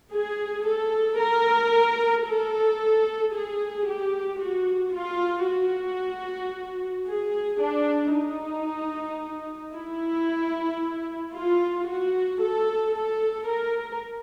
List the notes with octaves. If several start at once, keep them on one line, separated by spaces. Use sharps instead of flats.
G#4
A4
A#4
A4
G#4
G4
F#4
F4
F#4
G#4
D4
D#4
E4
F4
F#4
A4
A4
A#4